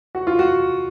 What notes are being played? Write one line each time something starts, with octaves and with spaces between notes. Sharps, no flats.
F#4
F4
F#4